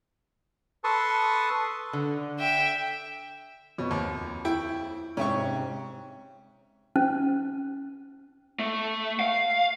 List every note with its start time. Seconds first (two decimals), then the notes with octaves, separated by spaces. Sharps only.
0.84 A4 B4 A5 C6 C#6 D#6
1.93 D3
2.40 E5 G5
3.78 F2 B2 C#5
3.91 D#2
4.45 E4 G5
5.17 G#2 C3 C#4 E5 G5 C#6
6.96 C#4
8.59 A3
9.20 F5